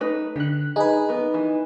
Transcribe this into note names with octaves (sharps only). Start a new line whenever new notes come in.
A3 D#4 B4
D3 G4 F#6
D#4 G#4 B4
B3 A#4
E3